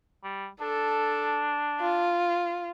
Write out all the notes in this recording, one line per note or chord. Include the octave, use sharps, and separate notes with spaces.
G3
D4 A4
F4